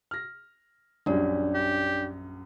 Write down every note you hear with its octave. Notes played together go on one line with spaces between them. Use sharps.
F6 A#6
A#1 F#2 G3 D4 C#5 D5
G4